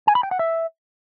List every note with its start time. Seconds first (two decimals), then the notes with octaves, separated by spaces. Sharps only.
0.07 G#5
0.15 B5
0.23 G5
0.31 F#5
0.39 E5